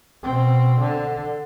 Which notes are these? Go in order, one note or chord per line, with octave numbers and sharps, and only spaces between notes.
B2 C4
D3